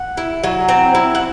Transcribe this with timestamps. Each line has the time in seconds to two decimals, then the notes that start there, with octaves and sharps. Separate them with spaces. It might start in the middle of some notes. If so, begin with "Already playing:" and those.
Already playing: F#5
0.17 E4
0.44 F#3
0.69 C4
0.95 E4
1.15 F#5